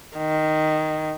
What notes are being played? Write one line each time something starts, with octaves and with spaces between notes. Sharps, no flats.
D#3